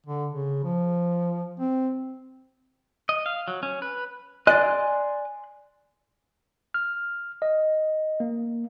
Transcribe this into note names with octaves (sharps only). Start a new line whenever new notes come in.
D3
C#3
F3
C4
D#5
F5
F#3
C#4
B4
D5 D#5 G#5 C6 F#6
F6
D#5
A#3